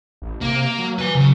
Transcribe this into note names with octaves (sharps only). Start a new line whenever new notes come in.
A1
C3 A#3
F#3
B4 G#5
C#3 F#3